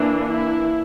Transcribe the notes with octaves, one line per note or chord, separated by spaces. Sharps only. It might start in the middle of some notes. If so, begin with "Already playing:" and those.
Already playing: E3 A#3 D4
E4